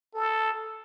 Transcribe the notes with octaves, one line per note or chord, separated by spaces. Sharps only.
A4